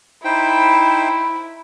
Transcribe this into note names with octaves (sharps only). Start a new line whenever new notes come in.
D#4 E4 C5 G5 B5